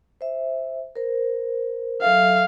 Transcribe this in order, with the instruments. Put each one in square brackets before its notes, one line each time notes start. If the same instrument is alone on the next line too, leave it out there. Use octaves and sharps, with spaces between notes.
[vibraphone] C5 E5
A#4 C5
[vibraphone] F#3 A4 E5 [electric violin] F5